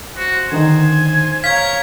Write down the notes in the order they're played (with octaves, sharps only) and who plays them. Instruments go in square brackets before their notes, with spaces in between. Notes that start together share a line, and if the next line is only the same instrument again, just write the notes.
[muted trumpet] F#4 [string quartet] C5
[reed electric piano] D3 D#3 D#4 [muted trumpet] G#5
[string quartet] A#4 C#5 [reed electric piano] F5 [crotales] G#6 B6